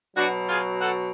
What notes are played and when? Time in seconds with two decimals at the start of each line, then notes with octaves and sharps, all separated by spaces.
0.16 B2 F#3 D4 F#4
0.48 F4 G#4
0.80 F#4 A4